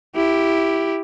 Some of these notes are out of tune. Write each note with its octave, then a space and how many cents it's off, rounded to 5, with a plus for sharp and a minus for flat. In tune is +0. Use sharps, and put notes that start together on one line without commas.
E4 +0 G4 +0